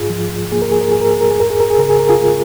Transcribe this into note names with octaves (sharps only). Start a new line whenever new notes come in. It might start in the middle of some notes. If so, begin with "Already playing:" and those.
Already playing: G#2 F4 G#4
F3
A#3 G#4
A#4
G#4
A#4
G#2 G#4
A#4
G#4
A#4
G#4
F2 A#4
G#4
A#4
G#4
C#3 A#4
G#4
A#4
F4 G#4
G#3